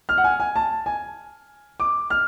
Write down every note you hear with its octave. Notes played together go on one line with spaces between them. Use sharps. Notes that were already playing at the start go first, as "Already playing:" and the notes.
F6
F#5
G#5
G#5
A5
G#5
D6
F6